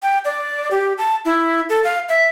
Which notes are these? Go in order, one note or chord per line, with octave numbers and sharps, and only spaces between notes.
G5
D5
G4
A5
E4
A4
F5
E5